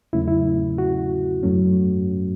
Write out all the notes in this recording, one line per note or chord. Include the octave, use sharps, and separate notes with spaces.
E2 C#3 F#3 A3 C#4 E4
E4
F#4
F#2 F#3 A3 C#4